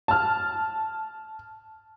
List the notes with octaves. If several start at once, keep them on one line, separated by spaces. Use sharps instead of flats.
A5 F6